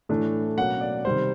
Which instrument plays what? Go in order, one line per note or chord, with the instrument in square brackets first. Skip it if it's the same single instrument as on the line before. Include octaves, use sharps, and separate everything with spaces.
[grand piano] A2 E3 A3 D4
B2 F#3 A#3 C#4 F#5
D5
C3 D#3 G3 C5